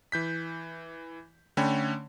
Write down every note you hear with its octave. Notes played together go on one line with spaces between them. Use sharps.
E3 G6 B6
D3 A3 C#4 C#5 G5 B5